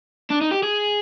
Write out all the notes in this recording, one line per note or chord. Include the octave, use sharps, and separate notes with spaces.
D4
D#4
G4
G#4